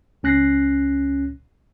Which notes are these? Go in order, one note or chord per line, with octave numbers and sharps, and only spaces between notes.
C#2 C#4 F#6 A#6 C7